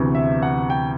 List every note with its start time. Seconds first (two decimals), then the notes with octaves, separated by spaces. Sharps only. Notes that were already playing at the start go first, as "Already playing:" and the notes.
Already playing: D2 C3 E3 B3
0.15 E5
0.42 F#5
0.70 G5